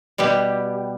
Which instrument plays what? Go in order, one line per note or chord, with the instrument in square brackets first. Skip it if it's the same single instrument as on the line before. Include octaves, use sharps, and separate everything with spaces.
[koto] B2 G3 B3 G4